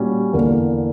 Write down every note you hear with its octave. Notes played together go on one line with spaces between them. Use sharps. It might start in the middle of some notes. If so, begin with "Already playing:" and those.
Already playing: A#2 G3 C#4 F#4
E2 D3 A#3